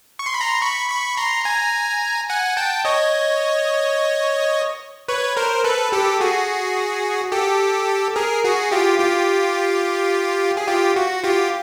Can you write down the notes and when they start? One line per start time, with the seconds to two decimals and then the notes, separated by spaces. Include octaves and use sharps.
0.19 C#6
0.26 C6
0.34 B5
0.41 A#5 C6
0.62 B5 C#6
0.89 B5 C#6
1.17 A#5 C6
1.45 G#5 A#5
2.30 F#5 G#5
2.57 G5 A5
2.85 C#5 D#5
5.08 B4 C#5
5.37 A#4 C5
5.64 A4 B4
5.92 G4 A4
6.21 F#4 G#4
7.32 G4 A4
8.16 G#4 A#4
8.44 F#4 G#4
8.71 F4 G4
8.99 F4 G4
10.57 G#4
10.67 F4 G4
10.96 F#4
11.24 F4 G4